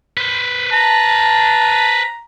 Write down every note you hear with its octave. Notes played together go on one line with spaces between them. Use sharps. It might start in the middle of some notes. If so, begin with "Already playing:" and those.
B4 C5
A5 A#5